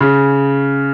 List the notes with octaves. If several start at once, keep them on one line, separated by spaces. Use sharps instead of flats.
C#3